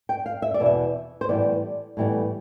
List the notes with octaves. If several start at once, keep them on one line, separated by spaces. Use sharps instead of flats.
G5
F5
E5
D5
E2 B2 B3
E5
C5
A2 E3 G3 B3 D5
A2 E3 G3 B3